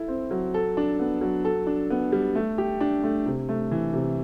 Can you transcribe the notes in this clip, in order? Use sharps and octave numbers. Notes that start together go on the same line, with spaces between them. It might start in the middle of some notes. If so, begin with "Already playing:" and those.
Already playing: E4 A4
C4
F#3
A4
D4
B3
F#3
A4
D4
B3
G3
A3
G4
D4
A3
C3
A3
E3
C3